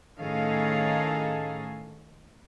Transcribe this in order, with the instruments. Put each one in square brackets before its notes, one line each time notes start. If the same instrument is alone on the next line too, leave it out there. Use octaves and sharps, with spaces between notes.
[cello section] A2 D#3 C#4 G#4 A4 F5